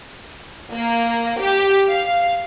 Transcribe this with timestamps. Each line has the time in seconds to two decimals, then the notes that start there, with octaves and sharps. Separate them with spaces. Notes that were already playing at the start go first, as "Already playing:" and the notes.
0.73 A#3
1.39 G4
1.90 F5